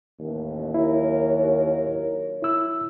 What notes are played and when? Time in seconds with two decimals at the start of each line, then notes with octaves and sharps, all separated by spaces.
0.20 A1 D#2
0.74 F#3 E4 A#4 C#5
2.42 E4 E6